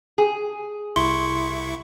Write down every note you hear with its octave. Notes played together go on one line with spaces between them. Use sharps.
G#4
C2 E4 C6 C#6